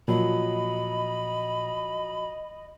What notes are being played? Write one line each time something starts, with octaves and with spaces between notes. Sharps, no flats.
A#2 F3 F#3 D#5 B5